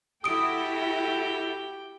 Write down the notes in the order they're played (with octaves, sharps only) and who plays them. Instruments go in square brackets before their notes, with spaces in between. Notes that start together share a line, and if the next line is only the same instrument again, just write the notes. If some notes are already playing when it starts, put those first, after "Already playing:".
[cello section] E4 F#4 A4 [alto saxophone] G4 [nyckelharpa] G5 [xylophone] D#6 D7